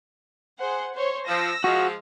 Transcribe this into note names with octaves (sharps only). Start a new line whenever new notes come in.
G#4 C5 F#5
C5 C#5
F3 E6 A#6
F3 G#3 F#4